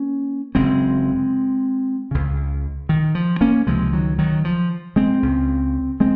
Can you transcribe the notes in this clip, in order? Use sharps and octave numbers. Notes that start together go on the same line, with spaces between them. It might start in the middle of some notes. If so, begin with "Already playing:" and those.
Already playing: A#3 C#4
F#1 F#2 C#3 G#3 C4
C#2 C#3
D#3
F3
A#3 C#4
C#2 C3 F3 G#3
D#3 F#3
D#3 F#3
F3
G#3 C4
C#2 C#3
G#3 C4